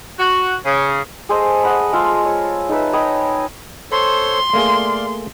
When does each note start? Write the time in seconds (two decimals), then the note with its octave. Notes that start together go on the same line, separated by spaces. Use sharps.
0.19 F#4
0.64 C#3
1.29 G#4 A4 C5 D#5
1.63 D#5 F#5 B5
1.93 G#3 F4 A4
2.25 C#5
2.69 D#4 A4 B4 E5
2.93 C#5 D#5 G5 B5
3.92 A4 C5 C#5 C6
4.53 A3 A#3 G#4 D5 F5